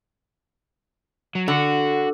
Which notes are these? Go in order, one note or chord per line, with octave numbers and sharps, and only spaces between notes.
F#3
D3 F#4